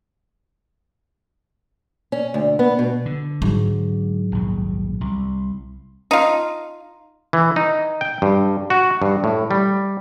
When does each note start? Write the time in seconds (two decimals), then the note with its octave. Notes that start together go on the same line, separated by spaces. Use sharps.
2.12 C#4
2.34 D2
2.59 B3
2.79 B2
3.06 D3
3.42 G#2 F#3
4.32 A#1 D#2
5.01 C2
6.11 D#4 F4
7.33 E3
7.56 D#4
8.01 G5
8.22 G2
8.70 F#4
9.02 G2
9.24 A2
9.51 G3